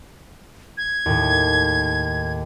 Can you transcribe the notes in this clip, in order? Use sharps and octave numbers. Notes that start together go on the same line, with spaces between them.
G#6
D#2 A2